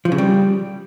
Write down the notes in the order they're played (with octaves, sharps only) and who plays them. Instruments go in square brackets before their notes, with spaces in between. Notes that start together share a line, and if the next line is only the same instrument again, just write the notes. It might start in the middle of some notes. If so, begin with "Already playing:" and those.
[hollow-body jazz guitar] F3
C#3
G3